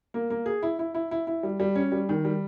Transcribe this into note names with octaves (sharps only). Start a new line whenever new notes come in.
A#3
A#3
G#4
E4
E4
E4
E4
E4
G3
G3
C#4
G3
D#3
G3